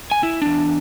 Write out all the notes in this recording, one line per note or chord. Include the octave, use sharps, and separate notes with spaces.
G#5
E4
E2 D4